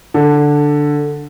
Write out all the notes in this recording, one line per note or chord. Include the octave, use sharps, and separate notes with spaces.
D3